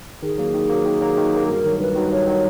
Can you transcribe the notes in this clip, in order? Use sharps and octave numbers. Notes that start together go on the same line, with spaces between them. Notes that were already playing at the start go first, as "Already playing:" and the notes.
D#3 G#4
F#3 A#3
D#3
F#3 A#3
D#3
F#3 A#3
D#3
F#3 A#3
G2 A#4
D#3 F#3
G2 B4
D#3 F#3
G2 C#5
D#3 F#3